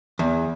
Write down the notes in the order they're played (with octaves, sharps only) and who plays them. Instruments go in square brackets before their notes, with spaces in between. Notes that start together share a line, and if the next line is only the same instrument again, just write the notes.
[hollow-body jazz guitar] E2